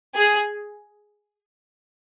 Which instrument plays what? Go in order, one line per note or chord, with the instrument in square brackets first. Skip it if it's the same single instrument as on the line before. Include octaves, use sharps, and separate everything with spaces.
[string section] G#4